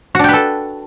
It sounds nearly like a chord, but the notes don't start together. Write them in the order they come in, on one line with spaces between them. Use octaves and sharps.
F#4 D4 G5 B4 A4